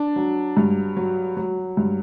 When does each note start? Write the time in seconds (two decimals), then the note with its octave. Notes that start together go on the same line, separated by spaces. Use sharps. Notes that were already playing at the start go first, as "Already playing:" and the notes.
Already playing: D4
0.16 F#3
0.57 G2
0.97 F#3
1.37 F#3
1.77 G2